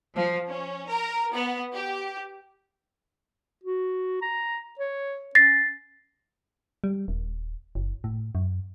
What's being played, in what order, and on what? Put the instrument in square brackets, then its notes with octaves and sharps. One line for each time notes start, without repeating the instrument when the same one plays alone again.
[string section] F3
C#4
A#4
B3
G4
[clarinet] F#4
A#5
C#5
[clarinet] C#4 [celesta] A6 A#6 C7
[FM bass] G3
D#1
F#1
A2
F#2